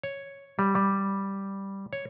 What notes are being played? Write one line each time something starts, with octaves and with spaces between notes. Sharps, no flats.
C#5
G3
G3
C#5